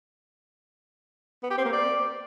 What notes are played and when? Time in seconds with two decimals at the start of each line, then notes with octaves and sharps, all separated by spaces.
1.43 B3
1.51 G4
1.58 C4
1.65 A#3
1.73 D5